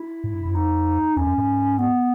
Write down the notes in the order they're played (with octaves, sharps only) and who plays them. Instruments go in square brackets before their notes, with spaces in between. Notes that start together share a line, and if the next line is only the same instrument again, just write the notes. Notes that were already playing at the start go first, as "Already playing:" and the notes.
Already playing: [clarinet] E4
[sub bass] G#2
G2
F#2
[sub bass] F2 [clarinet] D#4
[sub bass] E2 [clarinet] C#4
[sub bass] F2
G#2
[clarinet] B3